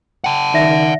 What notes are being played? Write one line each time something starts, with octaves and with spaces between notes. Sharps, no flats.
F#5 G5 A5
D#3 D5 E5 A#6